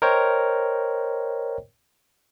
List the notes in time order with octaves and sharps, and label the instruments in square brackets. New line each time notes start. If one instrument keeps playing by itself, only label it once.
[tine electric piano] A#4 C5 C#5 D#5 G5